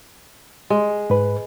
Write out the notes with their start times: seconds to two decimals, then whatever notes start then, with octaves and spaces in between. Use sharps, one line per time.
0.70 G#3
1.10 G#2 B4